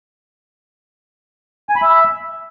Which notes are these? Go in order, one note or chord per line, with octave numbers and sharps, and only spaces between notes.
G#5
B5
E5